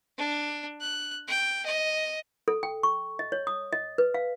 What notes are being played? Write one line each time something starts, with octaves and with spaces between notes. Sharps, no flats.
D4
F#6
G5
D#5
A4
G5
C#6
D#5
C#5
D#6
D#5
B4
F5